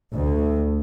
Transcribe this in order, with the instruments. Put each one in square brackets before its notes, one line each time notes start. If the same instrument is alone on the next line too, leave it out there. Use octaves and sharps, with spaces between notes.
[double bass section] D2